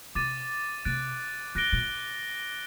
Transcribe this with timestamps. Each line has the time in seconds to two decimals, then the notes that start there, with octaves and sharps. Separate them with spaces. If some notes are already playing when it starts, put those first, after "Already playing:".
0.15 C3 D6 A6 D#7
0.85 C3 F#6 A6 D7
1.55 D3 F#6 A#6 D7 G7
1.73 A#2